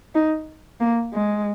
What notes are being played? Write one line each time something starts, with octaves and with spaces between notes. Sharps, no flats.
D#4
A#3
G#3